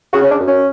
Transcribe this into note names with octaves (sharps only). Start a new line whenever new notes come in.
C#3 F#4
C#4
D4
F#2
C#4